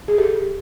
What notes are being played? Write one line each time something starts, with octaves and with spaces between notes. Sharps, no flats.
G#4
G4 A4